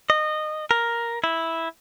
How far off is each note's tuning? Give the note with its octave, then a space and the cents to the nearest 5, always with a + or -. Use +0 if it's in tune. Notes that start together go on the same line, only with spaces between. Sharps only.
D#5 -20
A#4 +5
E4 -5